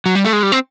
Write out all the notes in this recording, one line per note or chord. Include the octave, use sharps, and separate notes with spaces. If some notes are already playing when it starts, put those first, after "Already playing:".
F#3
G3
A3
G#3
G3
C4